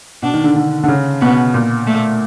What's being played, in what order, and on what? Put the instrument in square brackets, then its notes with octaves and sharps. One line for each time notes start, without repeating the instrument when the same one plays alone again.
[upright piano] B2 [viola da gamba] D4
[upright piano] D#3
D3
D3
D3
C#3
[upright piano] B2 [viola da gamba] B3
[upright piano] A#2
[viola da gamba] A3